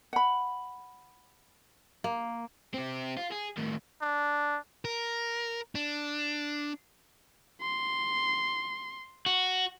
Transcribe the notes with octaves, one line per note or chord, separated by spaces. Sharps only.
F#5 B5
A#3
C4 G4
F4
G#4
A2 D#3
D4
A#4
D4
C6
F#4